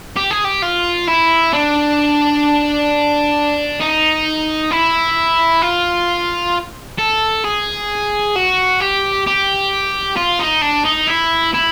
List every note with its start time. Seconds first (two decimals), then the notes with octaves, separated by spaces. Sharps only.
0.16 G4
0.31 G#4
0.45 G4
0.63 F4
1.08 E4
1.53 D4
3.81 D#4
4.71 E4
5.62 F4
6.99 A4
7.45 G#4
8.36 F#4
8.80 G4
9.26 G4
10.17 F4
10.40 D#4
10.62 D4
10.85 D#4
11.07 E4
11.54 E4